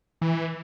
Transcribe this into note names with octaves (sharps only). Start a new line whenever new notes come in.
E3